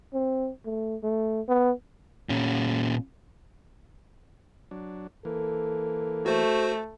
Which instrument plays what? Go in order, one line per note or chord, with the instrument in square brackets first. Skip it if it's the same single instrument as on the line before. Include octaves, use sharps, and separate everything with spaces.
[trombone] C4
A3
A3
B3
[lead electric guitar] A#2 C#4
[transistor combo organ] F#3 D4
[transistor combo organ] E3 A#3 [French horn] A4
[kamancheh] A3 [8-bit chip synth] F#4 C5